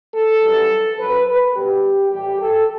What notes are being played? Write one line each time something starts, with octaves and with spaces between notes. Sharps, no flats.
A4
F#2 E3 G3
F#2 F#3 B4
B4
B2 G3 G4
A2 E3 G3 G4
A4